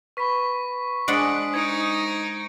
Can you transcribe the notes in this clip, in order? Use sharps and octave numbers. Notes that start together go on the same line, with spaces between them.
B4 B5 C#6 B6
G#3 D4 C5 F#5 D#6 B6 D7
D#4 G#6 C#7 D7